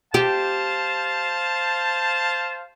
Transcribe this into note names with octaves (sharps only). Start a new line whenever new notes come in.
G4 C5 F5 A5